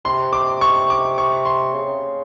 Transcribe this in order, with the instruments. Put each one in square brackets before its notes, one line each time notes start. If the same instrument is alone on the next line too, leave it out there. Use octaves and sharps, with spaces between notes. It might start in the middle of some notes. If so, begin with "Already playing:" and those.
[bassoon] C3 [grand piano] C6
[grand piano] D6
C#6
D6
C#6
C6
[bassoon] C#3